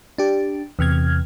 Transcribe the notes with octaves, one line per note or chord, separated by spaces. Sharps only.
D4 G4
E2 C3 F6 G#6